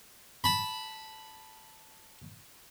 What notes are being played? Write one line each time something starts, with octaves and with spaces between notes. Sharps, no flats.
A5 B5